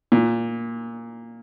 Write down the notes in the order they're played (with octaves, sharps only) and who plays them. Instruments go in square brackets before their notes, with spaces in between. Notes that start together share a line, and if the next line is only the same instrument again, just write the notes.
[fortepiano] A#2